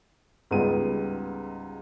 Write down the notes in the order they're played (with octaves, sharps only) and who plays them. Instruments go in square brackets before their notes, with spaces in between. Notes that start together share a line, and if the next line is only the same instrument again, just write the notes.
[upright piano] C#2 G#2 G3 B3 D#7